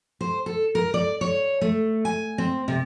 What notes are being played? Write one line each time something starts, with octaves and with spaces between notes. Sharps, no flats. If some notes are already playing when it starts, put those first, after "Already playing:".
C5
A4
A#4
D5
C#5
A3
G#5
C4
C3